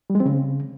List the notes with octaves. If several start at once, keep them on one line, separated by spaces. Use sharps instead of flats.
G3
G#3
C4
C#3